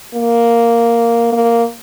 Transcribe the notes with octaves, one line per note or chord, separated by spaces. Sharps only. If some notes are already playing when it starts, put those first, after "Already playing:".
A#3
A#3